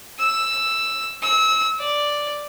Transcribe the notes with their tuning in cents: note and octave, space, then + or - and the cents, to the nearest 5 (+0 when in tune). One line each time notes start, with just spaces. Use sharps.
E6 +5
E6 -30
D5 +0